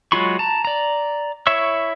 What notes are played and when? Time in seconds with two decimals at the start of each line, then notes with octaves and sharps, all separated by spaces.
0.12 F#3 G#3 F4 B5 C#6
0.39 A5 A#5
0.65 D5 A#5
1.47 E4 C#5 E5 C#6 E6